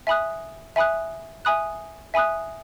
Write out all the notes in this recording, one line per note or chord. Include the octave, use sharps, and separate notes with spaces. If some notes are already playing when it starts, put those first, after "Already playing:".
E5 G#5 B5 D#6 F#6
E5 G#5 B5 D#6 F#6
E5 G#5 B5 D#6 F#6
E5 G#5 B5 D#6 F#6